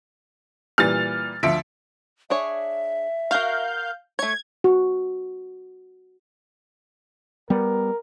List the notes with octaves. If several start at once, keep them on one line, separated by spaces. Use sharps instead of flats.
A#2 E3 G3 F6 A6
D2 F3 E5 D7
D4 G#4 C#5 E5
F#4 A#4 F5 G6
A3 C#5 G#6
F#4
G3 B3 A#4